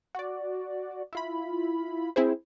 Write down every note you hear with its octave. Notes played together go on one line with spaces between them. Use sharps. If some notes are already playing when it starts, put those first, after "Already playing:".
F#4 D5
E4 F4 B5
C4 E4 G#4 C5